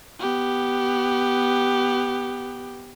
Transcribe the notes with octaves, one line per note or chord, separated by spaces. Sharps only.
B3 G4